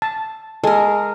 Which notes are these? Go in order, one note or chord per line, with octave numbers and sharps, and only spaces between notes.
A5
G#3 A4 A#4